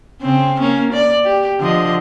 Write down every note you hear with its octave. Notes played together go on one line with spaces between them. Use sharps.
C#3 C4
A#3 C#4
D5
G4
D3 F3 D#5